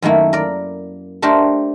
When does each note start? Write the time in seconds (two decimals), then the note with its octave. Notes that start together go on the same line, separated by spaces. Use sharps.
0.02 F#2 D#3 A3 A#3 E4
0.33 A#4 D5
1.22 A3 D4 G4 A#4 C5